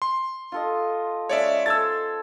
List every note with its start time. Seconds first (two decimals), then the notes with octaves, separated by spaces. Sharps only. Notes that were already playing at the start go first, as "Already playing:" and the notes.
0.02 C6
0.52 F4 A4 D#5
1.29 G#3 C#4 C#5 D5 E5
1.66 A4 C5 E6 G#6 A6